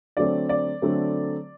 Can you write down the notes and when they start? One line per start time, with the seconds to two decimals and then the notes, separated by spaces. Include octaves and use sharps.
0.17 D3 F#3 A3 C4 D5
0.49 D5
0.82 D3 F#3 A3 C4